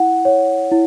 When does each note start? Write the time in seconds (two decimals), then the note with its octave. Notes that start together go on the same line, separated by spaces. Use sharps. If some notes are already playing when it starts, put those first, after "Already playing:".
Already playing: E4 F#5
0.25 C#5
0.72 E4